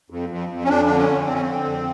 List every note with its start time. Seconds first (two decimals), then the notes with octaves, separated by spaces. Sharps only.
0.10 F2
0.29 F2
0.49 F2
0.64 C#4
0.68 F2 D4
0.85 D3 D4
0.97 C#4
1.07 F2
1.26 F2 C4
1.34 C#4
1.41 D3 C4
1.65 F2